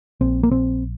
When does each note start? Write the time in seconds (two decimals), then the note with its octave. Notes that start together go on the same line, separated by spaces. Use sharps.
0.21 A#1 C4
0.43 A#3
0.51 A#1 C4